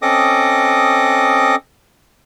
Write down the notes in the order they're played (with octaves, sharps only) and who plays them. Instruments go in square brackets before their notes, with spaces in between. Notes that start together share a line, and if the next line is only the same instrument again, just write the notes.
[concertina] C4 C#4 A4 D#5 D6 D#6